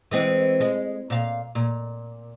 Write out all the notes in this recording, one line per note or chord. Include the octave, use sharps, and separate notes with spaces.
E3 G#3 C4
G#3
A#2 F5
A#2